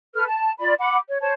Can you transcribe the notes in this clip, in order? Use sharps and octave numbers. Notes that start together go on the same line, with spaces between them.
A4 B4 F6
A5
F4 D5 B5
F#5 B5 D6
C#5
C5 C#5 A5